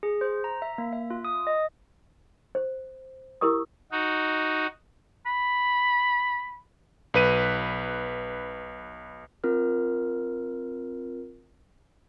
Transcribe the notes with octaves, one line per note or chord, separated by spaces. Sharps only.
G#4
C5
A#5
E5
A#3
E5
F4
D#6
D#5
C5
E4 G4 A#4 C#6 D#6
D#4 F#4
B5
B1 B4 D#7
C4 F4 A#4 F6